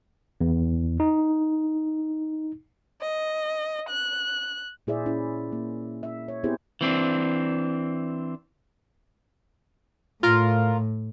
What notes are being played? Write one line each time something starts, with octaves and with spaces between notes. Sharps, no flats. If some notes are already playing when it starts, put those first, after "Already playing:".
E2
D#4
D#5
F#6
A#2 E4 G#4 C5 D5 E5
C#4 E4
A#3
E5
C#5
B3 C4 E4 G4 G#4 C5
E3 C4 D4
A2 F4 A#4